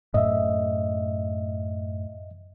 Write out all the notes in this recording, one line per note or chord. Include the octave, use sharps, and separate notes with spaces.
F#2 A2 D#5 E5